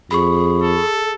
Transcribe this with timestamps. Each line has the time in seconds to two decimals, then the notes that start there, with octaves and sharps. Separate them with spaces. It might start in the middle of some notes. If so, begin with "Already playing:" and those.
0.11 F2 G#4 B5 C#6
0.62 A4